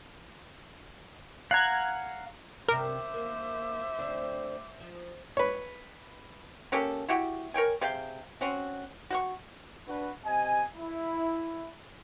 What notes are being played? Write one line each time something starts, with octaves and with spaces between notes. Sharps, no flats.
F5 F#5 A#5 F#6 G#6
G2 C3 A#4 C5 E5 D6
A#3
D2 C4 D4
F3
B4 C#5
A#3 C#4 G4 A4
E4 F#4 G4
A#4 C#5 G5 G#5
C3 G#4 F5 G5
C4 C#4 F#4
F#4 F#5 C#6
D4 F#4 B4
C3 D#5 G#5
E4